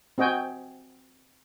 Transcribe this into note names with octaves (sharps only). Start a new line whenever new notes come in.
C4 F#4 D#5 G5 G#5